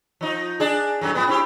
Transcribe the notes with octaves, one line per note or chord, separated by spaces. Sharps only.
F3 D#4
D4 G#4
F#2 A2 F#3
A2 B3
C4 E4 G4